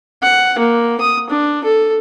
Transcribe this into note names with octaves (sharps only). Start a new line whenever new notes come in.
F#5
A#3
D#6
D4
A4